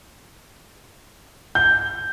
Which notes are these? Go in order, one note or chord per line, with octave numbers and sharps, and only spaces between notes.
G6